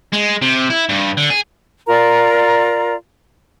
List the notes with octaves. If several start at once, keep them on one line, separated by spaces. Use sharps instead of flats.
G#3
C3
E4
G2
D3
G#4
F4 A#4 D5 A#5